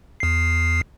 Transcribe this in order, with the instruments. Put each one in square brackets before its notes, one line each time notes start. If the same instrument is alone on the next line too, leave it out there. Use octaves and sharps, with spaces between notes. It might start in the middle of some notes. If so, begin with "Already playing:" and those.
[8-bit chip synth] E2 C7